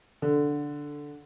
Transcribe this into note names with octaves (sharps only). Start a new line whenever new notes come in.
D3